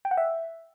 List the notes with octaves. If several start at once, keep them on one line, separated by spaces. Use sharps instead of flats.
G5
F#5
E5